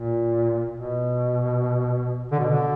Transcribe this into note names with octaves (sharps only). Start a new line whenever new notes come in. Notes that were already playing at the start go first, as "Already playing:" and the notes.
Already playing: A#2
B2
D3
B2
D3